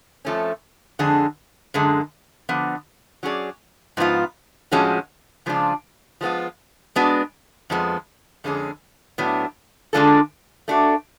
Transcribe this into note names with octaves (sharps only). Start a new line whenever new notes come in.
F2 F3 A3 C#4
F2 D3 G#3 D4 G#4
F#2 D3 G#3
D3 F3 B3
F#3 C#4 G#4 D5
G#2 F3 B3 F4
A2 F3 G#3 C#4 F#4
C#3 F3 G#3 D4 F4
F3 G#3 B3 F4
G#3 B3 D4 F#4
F2 F3 G#3 B3
F2 D3 G#3 C#4 G#4
A2 F#3 B3 D4
D3 G#3 D4 F4 A4
A3 D4 F#4